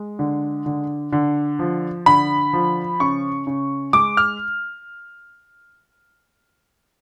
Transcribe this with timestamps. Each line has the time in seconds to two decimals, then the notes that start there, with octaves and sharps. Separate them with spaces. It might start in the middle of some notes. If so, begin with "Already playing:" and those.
Already playing: G#3
0.19 D3
0.66 D3
1.13 D3
1.59 F3
2.06 D3 B5
2.53 F3
3.00 C#3 C#6
3.47 C#3
3.93 G#3 D6
4.17 F6